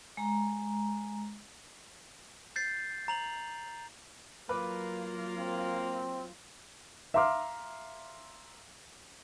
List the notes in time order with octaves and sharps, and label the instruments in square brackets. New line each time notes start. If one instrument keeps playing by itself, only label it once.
[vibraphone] G#3 A#5
[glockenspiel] G6 A6 C7
A#5 F7 F#7
[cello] F#3 F4 [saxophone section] A#3 [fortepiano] B4 B5 D6
[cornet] C4
[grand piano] E5 F5 A#5 C6 D6 F6